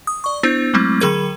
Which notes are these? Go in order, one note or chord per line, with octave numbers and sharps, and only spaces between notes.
D#6
D5 C#6
B3 D4 E4 C5
F#3 G#3 A3 C4 E4
D3 F#3 G#4 A#4 G#6